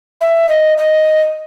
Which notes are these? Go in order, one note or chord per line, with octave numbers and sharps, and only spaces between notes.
E5
D#5
D#5